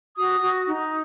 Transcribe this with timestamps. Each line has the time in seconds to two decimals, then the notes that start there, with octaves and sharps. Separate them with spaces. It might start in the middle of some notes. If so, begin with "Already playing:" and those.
0.17 F#4 D#6
0.42 F#4
0.66 D#4